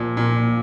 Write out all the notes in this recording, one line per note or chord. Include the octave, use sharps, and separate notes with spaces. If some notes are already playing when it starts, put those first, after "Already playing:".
Already playing: A#2 F3
A#2